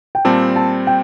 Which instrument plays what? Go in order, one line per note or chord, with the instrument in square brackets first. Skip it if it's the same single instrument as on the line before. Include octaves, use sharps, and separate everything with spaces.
[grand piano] G5
[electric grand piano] A#2 G3 C4 [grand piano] A5
[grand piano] A5
G5